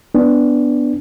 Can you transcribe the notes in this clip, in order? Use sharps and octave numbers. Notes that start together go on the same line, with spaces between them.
B3 D4